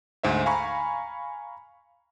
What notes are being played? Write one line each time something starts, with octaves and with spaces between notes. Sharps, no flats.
D2 G#2 C5 E5
F5 G#5 A#5 B5 C#6